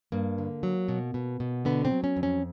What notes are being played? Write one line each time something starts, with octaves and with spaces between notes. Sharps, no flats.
G2 A#3
D3
F#3
B2
B2
B2
D3 B3
C4
F#3
C#4
F2
C#4